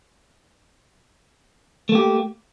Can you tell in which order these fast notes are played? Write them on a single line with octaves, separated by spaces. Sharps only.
A3 A#3 G4